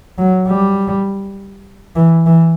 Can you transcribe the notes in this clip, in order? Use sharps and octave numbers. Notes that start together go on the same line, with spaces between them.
F#3
G3
E3
E3